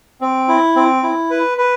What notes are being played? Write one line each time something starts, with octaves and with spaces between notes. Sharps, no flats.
C4
E4
C4
E4
B4
B4